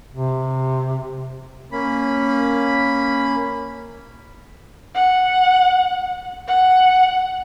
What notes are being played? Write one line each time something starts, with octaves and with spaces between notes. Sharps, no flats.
C3
A#3 C#4 B5
F#5
F#5